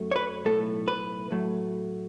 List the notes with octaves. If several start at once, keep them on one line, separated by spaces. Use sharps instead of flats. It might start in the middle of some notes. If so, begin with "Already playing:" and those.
Already playing: F#2 F#3 A3
C#5
B4
B1 A2 A3 A4
B4
A2 F#3 A3